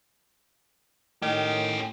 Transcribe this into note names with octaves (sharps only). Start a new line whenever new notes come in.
A2 D#3 C#4 G4